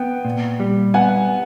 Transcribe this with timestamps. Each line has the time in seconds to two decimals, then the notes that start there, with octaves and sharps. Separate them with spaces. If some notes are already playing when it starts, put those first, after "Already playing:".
Already playing: B3 G5
0.25 A#2
0.60 G3
0.94 B3 F#5 G#5